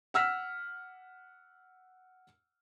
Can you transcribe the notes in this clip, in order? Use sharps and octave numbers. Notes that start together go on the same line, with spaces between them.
F#5 E6 F6 B6